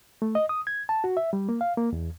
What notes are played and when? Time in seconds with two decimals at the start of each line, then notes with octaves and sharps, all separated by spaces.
0.22 A3
0.35 D#5
0.49 D#6
0.67 G#6
0.89 A5
1.04 F#4
1.17 E5
1.33 G3
1.49 A#3
1.61 F5
1.77 A#3
1.93 E2